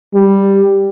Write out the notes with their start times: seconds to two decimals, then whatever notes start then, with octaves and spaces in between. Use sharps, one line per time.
0.14 G3